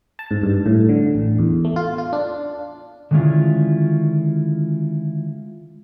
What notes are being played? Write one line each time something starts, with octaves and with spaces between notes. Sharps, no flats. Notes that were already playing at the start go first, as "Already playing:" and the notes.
A5
G#2
G2
A2
D3
A1
E2
A3
F4
F4
D4
D3 D#3 G#3 C#4 E4 F4